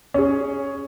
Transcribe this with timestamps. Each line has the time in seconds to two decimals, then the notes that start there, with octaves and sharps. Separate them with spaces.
0.14 C#4 G#4